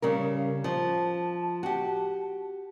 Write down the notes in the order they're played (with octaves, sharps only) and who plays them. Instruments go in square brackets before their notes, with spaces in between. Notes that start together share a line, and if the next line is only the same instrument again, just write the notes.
[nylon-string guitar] C#3 G3 A#4 [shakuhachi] F5
[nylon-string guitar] F3 [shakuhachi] A5
[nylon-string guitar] F#4 G4